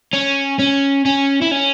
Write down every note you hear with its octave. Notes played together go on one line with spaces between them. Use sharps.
C#4
C#4
C#4
E4
C#4